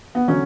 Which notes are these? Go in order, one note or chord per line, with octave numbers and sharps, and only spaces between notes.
B3
D3 F#3 C#4